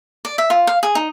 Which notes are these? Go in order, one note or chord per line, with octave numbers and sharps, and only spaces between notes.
D5
E5
F4
F5
G#4
D#4